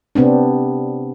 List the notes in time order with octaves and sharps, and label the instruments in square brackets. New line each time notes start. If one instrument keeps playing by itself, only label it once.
[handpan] C3 B3 C4 D4